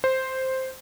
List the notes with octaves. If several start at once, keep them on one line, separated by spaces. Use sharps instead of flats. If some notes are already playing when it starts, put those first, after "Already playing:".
C5